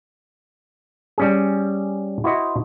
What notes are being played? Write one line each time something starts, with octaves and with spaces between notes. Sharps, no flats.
G3 C#4 G#4
E4 F#4 C5 D#5